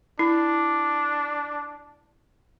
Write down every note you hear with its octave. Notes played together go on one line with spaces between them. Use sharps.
D4 E4